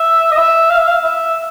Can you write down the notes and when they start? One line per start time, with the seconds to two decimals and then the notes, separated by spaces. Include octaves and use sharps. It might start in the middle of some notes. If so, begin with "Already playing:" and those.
Already playing: E5
0.32 D#5
0.37 E5
0.70 F5
0.79 E5
0.88 F5
1.04 E5